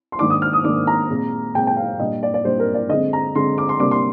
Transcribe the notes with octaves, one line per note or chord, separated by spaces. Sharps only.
C6
G#2 D#3 A#3 D4 D6
D#6
F6
D#6
G#2 D#3 A#3 D4 D6
A#5
A#2 G#3 C4
A#2 G#3 C4 G5
G5
F5
A#2 G3 D4 D#5
D5
D5
A#2 G3 D4 C5
A#4
D5
D3 G#3 C4 D#5
A#5
D3 G#3 C4 C6
D6
C6
C3 G3 A#3 D4 D6
C6